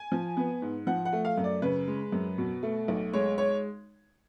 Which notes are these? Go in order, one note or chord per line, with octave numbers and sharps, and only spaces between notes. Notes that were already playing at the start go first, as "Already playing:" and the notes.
Already playing: G#5
F3
B3
G#2
F3 F#5
F#5
A3
F5
F#2
D5
C#3 B4
G#3
F#2
B2
A3
B1
G#3 C#5
C#5